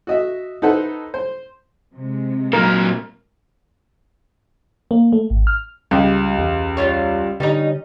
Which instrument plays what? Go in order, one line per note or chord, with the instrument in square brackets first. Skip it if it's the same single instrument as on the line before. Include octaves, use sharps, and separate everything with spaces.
[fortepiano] F#4 D#5 E5
D#4 E4 A4 B4 C5 F#5
C5
[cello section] C3 G#3
[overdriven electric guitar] A#2 F#3 [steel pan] A#4
[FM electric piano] A#3
A3
G#1
F6
[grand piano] C#2 [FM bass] G3 [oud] G4
[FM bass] E2
[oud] G3 F4 C#5
[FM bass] D3 [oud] G3 C#4 D#4